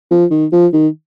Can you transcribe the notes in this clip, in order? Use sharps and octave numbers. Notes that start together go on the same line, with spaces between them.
F3
D#3
F3
D#3